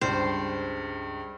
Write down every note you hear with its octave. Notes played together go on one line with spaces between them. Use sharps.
C#2 G2 C5